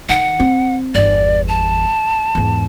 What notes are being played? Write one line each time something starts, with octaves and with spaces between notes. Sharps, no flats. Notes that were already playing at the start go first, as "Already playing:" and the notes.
D#3 F#5
C4
G1 E2 D5
A5
E2 G#2